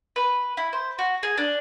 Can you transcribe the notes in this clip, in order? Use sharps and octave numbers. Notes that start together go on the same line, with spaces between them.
B4
E4
C5
F#4
G#4
D4